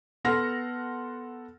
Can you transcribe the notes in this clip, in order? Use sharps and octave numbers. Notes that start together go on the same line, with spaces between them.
B3 A4 F#5 C6 F6 A#6